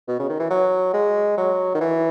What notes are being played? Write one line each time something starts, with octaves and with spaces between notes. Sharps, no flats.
B2
C#3
D#3
E3
F#3
G#3
F#3
D#3
E3